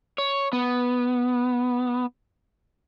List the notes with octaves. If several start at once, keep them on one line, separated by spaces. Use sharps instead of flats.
C#5
B3